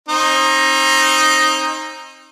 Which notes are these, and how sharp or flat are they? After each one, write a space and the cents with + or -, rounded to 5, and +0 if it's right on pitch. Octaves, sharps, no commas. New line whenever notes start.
C4 +35 D#4 +0